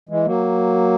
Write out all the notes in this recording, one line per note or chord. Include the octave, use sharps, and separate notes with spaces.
E3 G#3
F#3 A#3